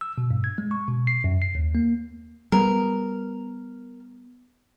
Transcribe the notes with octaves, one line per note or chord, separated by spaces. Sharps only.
E6
B2
G2
G#6
G#3
C#6
B2
C7
F#2
C7
D#2
A#3
G3 B3 A#4